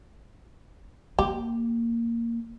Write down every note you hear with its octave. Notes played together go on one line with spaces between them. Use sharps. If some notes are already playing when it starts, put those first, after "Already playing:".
A#3 G4